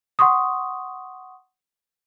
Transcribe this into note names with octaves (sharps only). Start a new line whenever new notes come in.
F#5 C6 C#6 D#6